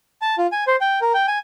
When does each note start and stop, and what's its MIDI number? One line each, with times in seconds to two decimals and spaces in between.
0.22 0.35 81
0.38 0.47 65
0.52 0.64 80
0.67 0.76 72
0.81 1.00 79
1.01 1.13 70
1.14 1.26 79
1.28 1.39 80